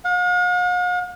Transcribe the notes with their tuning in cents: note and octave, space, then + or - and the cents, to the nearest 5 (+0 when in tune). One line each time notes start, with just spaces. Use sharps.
F5 +45